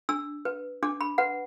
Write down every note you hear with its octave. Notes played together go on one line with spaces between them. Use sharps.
D4 E6
B4
D4 D6
B5
B4 F#5